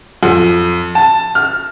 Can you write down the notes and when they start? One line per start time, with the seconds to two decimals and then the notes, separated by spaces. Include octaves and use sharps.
0.23 F2
0.95 A5
1.35 F6